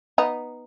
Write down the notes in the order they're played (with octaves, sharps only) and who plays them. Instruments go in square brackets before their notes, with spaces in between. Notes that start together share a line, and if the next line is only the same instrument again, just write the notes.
[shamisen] B3 D#4